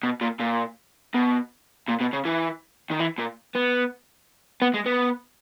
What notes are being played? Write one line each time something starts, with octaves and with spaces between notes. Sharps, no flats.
B2
A#2
A#2
B2
A#2
B2
C#3
E3
D#3
E3
A#2
B3
B3
G#3
B3